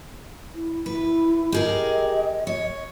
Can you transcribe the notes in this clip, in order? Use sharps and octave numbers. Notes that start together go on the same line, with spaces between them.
E4
E4 B4
G4 G#4 A#4 D#5
C#5